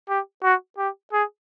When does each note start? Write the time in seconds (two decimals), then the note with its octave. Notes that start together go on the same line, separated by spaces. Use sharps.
0.09 G4
0.44 F#4
0.78 G4
1.13 G#4